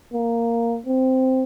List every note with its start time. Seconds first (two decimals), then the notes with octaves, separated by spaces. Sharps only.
0.13 A#3
0.86 C4